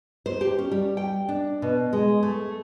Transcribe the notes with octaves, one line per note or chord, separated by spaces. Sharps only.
C5
G4
C#4
G3
G5
D4
B2
G#3
A3